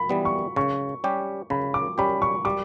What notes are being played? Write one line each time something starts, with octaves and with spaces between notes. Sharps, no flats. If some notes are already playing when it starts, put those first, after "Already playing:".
Already playing: B5
E3 G3 B3
C#6
C#3 C#6
G3 C#4 G4
C#3 B5
D6
G3 C#4 G4 B5
C#6
G3 D6